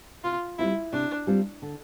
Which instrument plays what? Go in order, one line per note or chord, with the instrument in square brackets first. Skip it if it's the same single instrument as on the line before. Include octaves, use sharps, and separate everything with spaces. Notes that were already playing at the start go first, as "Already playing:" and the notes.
[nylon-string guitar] C3 [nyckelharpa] F4
[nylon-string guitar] G3 C4 F4 [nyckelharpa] E4
[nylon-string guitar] C3 [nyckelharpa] D4
[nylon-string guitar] G3 C4 F4
D3